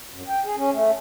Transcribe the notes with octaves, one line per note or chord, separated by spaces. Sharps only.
F#2
G5
G#4
C#4
A3